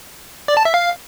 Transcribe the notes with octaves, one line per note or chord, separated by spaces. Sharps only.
D5
A5
E5
F5